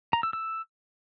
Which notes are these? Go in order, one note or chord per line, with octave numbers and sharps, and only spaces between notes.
A#5
E6
E6